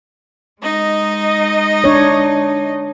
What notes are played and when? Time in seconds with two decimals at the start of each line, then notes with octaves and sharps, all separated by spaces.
0.61 G#3 D#4 D#5
1.84 D4 C#5